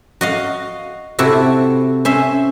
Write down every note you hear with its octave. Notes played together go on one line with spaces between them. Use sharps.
F#4 D#5 F5
C3 E4 F#4 A4
C#4 C5 E5